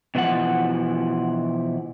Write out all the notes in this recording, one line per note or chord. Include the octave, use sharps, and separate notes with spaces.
B2 E3 F3 F#5